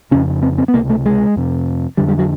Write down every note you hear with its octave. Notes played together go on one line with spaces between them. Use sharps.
F2 C#3 C#4
C4
C4
B3
C#2 C3 A#3
A3
G#3
F2 C3
F2 D3 G3
G3
F#3